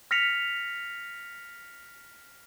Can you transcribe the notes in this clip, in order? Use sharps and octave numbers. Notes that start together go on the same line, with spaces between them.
F6 A#6 B6 C#7 F7